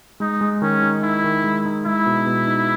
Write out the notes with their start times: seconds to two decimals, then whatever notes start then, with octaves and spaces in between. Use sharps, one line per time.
0.20 G#3 D#4
0.41 G#3
0.62 D#3 C#4
0.83 D#4
1.03 D#4 E4
1.24 D#3
1.44 G#3
1.65 D#4
1.86 G#3 E4
2.06 B2
2.26 B2
2.47 D#4